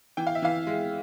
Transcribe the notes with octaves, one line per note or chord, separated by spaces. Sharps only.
E3 G5
F5
E5
E3 F5
G#3